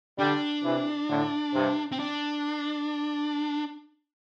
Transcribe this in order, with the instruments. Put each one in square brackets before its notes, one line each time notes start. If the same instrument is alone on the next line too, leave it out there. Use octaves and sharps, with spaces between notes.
[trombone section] D3 G3 [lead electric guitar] D4
[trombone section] C3 E3
A2 D3
G2 C3
[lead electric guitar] C4
D4